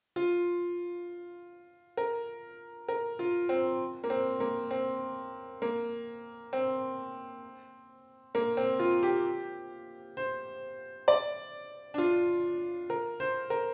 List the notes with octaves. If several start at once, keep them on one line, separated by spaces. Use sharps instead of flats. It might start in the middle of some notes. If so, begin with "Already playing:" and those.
F4
A#4
A#4
F4
C4
A#3
C4
A#3
C4
A#3
C4
A#3
C4
F4
G4
C5
D5
D4
F4
A#4
C5
A#4